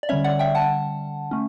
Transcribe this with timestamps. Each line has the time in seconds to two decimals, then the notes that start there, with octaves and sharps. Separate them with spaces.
0.03 D5
0.09 D3 G3 C#4 C#5 E5
0.24 D5 F#5
0.39 E5 G5
0.55 F#5 A5
1.31 A3 C#4